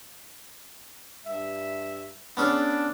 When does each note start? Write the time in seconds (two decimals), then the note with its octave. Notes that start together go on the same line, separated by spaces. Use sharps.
1.25 G2 E5
2.37 B3 C#4 D4 G#4